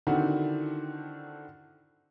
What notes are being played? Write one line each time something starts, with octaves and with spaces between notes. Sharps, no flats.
D3 D#3 C4 D4 E4 F#4